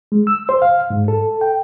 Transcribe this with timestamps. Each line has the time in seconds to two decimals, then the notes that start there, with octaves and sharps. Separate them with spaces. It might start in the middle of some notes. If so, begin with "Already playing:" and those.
0.12 G#3
0.27 E6
0.49 C5
0.62 F5
0.90 G#2
1.08 A4
1.41 G5